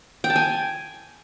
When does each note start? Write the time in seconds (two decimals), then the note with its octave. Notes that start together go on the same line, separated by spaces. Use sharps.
0.24 G5
0.30 A5
0.36 G#5